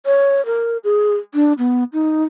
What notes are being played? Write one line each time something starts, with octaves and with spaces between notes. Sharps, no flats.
C#5
A#4
G#4
D4
B3
D#4